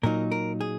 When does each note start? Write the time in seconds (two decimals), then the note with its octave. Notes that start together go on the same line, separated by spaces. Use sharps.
0.03 A#2 F#3 D#4 A#4
0.32 A#4
0.61 G#4